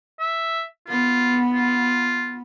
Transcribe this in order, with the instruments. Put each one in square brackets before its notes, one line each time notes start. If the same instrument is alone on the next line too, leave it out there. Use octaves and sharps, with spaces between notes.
[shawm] E5
[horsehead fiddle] B3 [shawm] F4
[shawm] F4